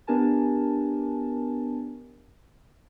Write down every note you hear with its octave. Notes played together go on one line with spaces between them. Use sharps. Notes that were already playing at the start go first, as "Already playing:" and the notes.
B3 D4 G4 A#4 G#5 A5